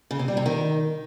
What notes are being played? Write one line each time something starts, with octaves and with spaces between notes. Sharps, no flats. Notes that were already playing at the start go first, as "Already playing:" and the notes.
C#3
C3
G3
C3
D#3